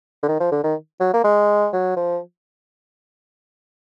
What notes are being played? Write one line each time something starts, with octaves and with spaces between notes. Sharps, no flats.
D3
D#3
F3
D3
D#3
F#3
A#3
G#3
F#3
F3